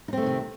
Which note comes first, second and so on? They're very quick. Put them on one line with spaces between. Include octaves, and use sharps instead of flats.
D#4 C4 A3 D#3 C3